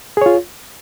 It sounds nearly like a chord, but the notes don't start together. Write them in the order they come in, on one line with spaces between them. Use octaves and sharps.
G#4 C#5 F4